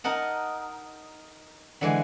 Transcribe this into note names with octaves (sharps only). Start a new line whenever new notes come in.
D#4 A#4 D#5 F#5 A5
D3 E3 G#3